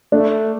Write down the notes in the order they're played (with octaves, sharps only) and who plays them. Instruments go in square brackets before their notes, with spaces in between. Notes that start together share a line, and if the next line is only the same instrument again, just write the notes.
[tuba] A3 [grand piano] D4